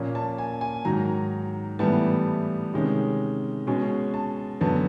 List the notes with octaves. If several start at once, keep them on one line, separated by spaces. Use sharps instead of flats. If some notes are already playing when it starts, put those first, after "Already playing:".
Already playing: A#2 F3 A#3 C#4
A5
G#5
G#5
G#2 D#3 F#3 A#5
A2 E3 G3 B3 A5
C3 D#3 G#3 C#4
B2 G#3 C#4
A5
F#2 D3 F#3 B3 A5